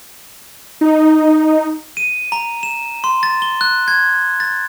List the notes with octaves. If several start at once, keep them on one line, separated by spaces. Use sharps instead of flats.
D#4
D#7
A#5
E7
C6
A6
G7
F#6
G#6
A6